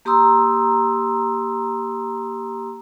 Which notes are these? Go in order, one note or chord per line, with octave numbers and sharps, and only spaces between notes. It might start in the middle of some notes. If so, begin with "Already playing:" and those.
A#3 G4 A#5 C6 D#6 E6